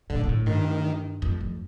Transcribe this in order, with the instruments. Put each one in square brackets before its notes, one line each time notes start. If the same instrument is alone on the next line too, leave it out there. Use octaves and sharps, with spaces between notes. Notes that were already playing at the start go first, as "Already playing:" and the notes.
[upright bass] A#2 [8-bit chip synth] D3
[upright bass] A#2
A2
[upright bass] G2 [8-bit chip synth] D#3
[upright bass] F2
F2